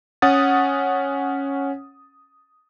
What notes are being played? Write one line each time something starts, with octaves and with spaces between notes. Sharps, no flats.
C#4 F#5 D#6 A6